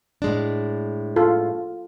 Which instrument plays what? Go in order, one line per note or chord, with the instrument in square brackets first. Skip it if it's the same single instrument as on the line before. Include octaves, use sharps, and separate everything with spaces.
[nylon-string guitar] A2 G#3 D4
[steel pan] F4 A4